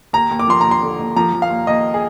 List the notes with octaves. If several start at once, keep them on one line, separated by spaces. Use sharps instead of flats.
D#2 A#5
D#2
D6
F3 C6
D#2 A#5
C6
D3
D#2
F3 A#5
F3
F5
D#2
D#2 D#5
G#4